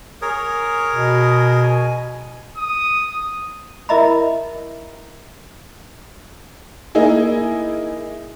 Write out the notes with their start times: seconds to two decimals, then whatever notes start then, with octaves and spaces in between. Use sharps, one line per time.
0.22 G#4 A#4 C#5
0.92 B2
1.63 G#5
2.57 D#6
3.89 E4 A#4 D#5 E5 A#5 B5
6.95 A#3 D#4 E4 G#4